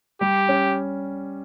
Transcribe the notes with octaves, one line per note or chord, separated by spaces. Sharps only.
G3 G4
C#4